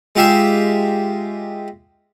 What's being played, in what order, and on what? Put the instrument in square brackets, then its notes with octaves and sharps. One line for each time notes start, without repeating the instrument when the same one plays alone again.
[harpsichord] G#3 F4 G4 E5 F5